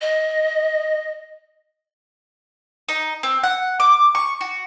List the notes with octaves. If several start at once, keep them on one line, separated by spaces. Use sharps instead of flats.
D#5
D#4
C4
F#5
D6
C#6
F#4